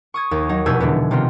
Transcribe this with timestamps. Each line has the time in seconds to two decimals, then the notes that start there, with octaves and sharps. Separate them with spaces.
0.14 C#6 D#6 G#6
0.31 D#2
0.49 F#3 D#4
0.66 F1 E2 B2 G#5 E6 G6
0.80 D3 E3 G#3 B3
1.11 C3 D#3 B3 C4 F4